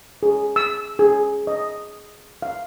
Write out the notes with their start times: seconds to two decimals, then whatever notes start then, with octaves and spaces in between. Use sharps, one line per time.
0.23 G#4
0.56 E6
0.99 G#4
1.47 D#5
2.42 F5